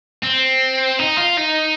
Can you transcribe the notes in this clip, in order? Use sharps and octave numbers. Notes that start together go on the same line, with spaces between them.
C4
D#4
F4
D#4